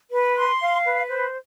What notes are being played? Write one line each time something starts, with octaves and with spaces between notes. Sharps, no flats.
B4
C6
F5
B4
C5